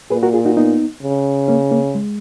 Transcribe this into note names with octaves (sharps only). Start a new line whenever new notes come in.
A#2 G#4 B4
F#4 A#4
F4 G#4
D#4 F#4
B3 D#4
C#3
A#3 C#4
A#3 C#4
G#3